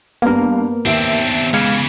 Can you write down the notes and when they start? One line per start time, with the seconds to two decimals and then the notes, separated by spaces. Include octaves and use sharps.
0.22 G2 A#3 B3 A#4 F5
0.85 D#2 C4 D4 E5
1.53 C#3 E3 G#3 F5 G#6